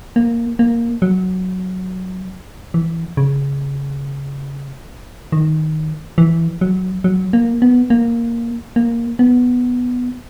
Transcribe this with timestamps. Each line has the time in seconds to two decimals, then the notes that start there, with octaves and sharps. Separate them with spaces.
0.16 A#3
0.59 A#3
1.02 F#3
2.74 E3
3.17 C#3
5.32 D#3
6.18 E3
6.61 F#3
7.04 F#3
7.33 A#3
7.62 B3
7.90 A#3
8.76 A#3
9.19 B3